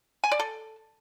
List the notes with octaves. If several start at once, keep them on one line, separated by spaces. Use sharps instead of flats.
G#5
D5
A4